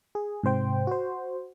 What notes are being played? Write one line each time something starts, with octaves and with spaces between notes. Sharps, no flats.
G#4
G#2 C3 C5 G5
F#4 C5